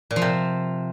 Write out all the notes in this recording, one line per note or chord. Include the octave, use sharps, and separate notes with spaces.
A#2
F3
C3